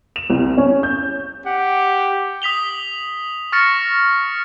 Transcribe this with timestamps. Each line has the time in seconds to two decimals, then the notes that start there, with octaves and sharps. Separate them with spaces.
0.16 E7
0.30 C2
0.57 C#4
0.83 G6
1.46 G4 F#5
2.42 D#6 B6 F7 G7
3.52 C#6 F6 A6 A#6 C#7